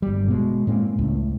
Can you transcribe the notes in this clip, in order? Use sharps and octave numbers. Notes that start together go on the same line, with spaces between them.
G1 G3
B2 G#3
A2 G#3 A#3 C4
C#2 A2